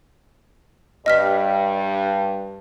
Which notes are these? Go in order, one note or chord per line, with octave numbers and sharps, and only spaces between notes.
G2 D#5 F6 B6